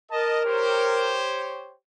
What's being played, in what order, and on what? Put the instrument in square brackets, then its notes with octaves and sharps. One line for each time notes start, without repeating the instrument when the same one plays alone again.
[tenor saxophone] A#4 [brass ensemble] D#5 A5
[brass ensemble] G4 C5 C#5